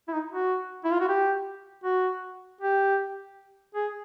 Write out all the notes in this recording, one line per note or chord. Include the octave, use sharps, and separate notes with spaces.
E4
D#4
F#4
E4
F4
F#4
G4
F#4
G4
G#4